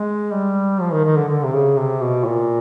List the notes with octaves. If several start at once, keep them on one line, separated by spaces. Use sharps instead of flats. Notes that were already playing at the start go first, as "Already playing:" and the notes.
Already playing: G#3
G3
F3
D#3
D#3
D3
D3
C3
C#3
C3
B2
A#2